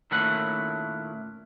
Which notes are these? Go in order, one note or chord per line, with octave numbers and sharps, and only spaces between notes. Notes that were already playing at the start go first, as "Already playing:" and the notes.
A#2 D#3 A3 C#4 E4 F#5